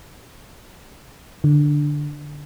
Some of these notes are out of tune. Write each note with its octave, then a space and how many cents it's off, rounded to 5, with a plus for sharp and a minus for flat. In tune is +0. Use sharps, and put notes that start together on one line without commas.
D3 +5